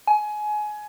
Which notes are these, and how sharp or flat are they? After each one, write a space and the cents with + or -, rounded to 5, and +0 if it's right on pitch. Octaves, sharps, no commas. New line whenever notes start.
G#5 +25